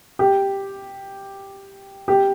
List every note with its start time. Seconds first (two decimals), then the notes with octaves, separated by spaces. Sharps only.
0.19 G4
2.08 G4